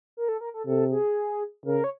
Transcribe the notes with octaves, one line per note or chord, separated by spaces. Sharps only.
A#4
A4
A#4
A4
C3 A4
G#4
C#3 A#4
C#5